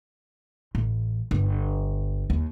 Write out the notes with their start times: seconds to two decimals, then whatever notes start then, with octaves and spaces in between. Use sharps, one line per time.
0.75 A1
1.31 G1
2.30 D#2